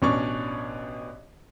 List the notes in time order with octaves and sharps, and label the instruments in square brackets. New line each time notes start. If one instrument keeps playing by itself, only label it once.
[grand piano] A1 B2 C#4 D4 D5 C#6